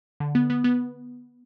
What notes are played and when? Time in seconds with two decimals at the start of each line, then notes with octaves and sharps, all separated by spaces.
0.20 D3
0.35 B3
0.50 B3
0.64 B3